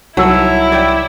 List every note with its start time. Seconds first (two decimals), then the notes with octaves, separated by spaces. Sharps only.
0.17 C2 F#3 D#4 E4 A#4
0.72 D5 G5